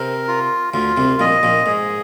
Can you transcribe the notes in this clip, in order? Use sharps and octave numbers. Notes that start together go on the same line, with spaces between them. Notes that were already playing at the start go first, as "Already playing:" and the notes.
Already playing: C3 C4 A#4
F4
D2 D3 F4
C2 C3
A#1 A#2 D#5
A#1 A#2
G#2 G#4